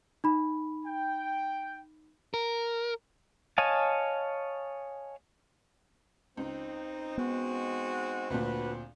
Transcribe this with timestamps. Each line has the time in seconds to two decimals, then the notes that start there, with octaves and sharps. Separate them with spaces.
0.24 D#4 B5
0.85 G5
2.34 A#4
3.58 C#5 D#5 F5 G#5 A5
6.37 C#2 C4 D#4
7.18 G#3 B3 D#4 F#4
8.30 D2 A#2 D4 F#4 B4